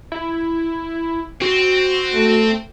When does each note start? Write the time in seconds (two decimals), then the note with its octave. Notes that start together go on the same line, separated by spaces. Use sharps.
0.12 E4
1.42 C4 F#4
2.14 A3